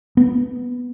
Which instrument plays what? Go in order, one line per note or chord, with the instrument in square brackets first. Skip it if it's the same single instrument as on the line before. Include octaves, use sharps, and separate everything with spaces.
[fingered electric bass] B3